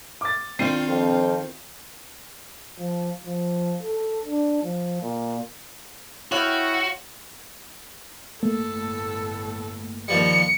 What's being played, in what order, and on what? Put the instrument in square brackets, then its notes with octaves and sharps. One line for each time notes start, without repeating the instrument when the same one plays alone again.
[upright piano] D6 A6
[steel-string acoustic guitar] D#3 C4 [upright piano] D4 C7 D#7 [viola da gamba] F4
[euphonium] F2
F3
F3
A4
D4
F3
A#2
[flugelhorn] E4 [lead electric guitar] F#4 [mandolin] C#5 F5 G5
[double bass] G1 A2 [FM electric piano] A3 A#3 [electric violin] A4
[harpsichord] D#2 F3 G3 [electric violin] C#7